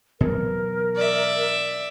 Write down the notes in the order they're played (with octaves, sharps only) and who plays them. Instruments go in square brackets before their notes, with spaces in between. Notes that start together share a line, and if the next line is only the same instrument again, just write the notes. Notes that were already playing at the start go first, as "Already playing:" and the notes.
[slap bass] B2 E3 F#3 [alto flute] A#4
[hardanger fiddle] D5 E5